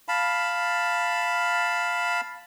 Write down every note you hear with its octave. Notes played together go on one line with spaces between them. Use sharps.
F5 A5 B5